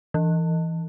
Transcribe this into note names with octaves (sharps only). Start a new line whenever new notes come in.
E3